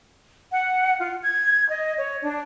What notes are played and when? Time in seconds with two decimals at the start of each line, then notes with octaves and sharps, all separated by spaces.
0.52 F#5
1.00 F4
1.22 G#6
1.70 D#5
1.98 C#5
2.23 D4